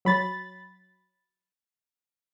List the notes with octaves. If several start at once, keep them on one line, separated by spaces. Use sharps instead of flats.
F#3 B5 A6